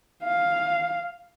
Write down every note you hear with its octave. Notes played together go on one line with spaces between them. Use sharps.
F5